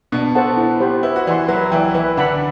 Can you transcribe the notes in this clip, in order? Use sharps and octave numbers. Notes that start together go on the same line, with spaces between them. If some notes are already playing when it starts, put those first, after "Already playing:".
B2 B3 D4
A4 C5 F#5 A5
E4
G4 C5 F#5 B5
E4 B4
F#4
E3 E4 D5 F#5 C6
F#3 F#4 B4
E3 E4 D5 G5
E3 E4 B4
D3 D4 F#5 B5